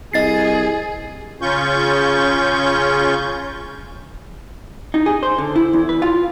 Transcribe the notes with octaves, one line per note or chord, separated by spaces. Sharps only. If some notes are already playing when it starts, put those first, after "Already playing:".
C2 G#4 D#5 A6 C7
C#3 C#4 F4 C#6 G6
D#4
G#4
C5
D3
E4
E2
B4
F4